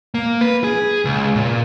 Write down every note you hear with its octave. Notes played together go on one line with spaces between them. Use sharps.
A#3
B4
G#4
C#2
A#2